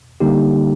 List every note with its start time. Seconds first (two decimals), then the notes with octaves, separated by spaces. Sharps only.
0.20 D3 G3 A#3 D#4 G4